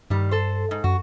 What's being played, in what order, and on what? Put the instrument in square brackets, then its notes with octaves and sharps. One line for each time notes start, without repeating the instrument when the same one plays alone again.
[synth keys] G2 [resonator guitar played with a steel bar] D#3 G3
[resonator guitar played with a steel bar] A4 C5
G#2
[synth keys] F#2 [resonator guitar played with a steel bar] F#4